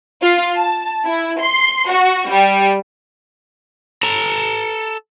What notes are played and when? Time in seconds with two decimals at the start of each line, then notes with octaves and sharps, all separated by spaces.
0.22 F4
0.56 A5
1.04 E4
1.40 C6
1.89 F#4
2.29 G3
4.03 A4 A#5